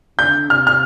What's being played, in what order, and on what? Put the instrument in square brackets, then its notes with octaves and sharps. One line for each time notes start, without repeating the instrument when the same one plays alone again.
[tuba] D3 [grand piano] G6
[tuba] C3 [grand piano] F6
[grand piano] F6